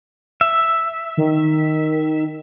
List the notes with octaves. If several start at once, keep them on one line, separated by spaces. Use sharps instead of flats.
E5
D#3